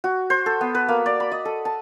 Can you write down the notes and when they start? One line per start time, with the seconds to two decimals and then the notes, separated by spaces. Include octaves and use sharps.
0.04 F#4
0.30 C5
0.46 A4
0.61 B3
0.75 B4
0.88 A#3
1.06 D5
1.20 B5
1.32 D#5
1.45 A4
1.65 A5